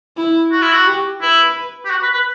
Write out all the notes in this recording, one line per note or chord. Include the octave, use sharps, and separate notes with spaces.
E4
F#4
E4
F#4
G4
E4 B4
G4
F#4
B4
B4